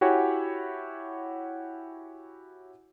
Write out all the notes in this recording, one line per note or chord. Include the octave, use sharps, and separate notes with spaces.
E4 F#4 G4 C#5 F#5 G#5